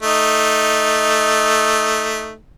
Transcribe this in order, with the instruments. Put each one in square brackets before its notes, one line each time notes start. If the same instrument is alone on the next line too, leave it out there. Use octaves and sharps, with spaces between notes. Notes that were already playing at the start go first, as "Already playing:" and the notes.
[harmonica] A3 D#4